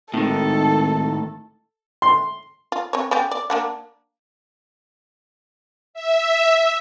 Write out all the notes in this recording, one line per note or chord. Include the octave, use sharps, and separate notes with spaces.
G#1 A2 D#3 A4
C6
F4
C4 C#5
B3 C#4 G4
D5
A#3 D4 F#5
E5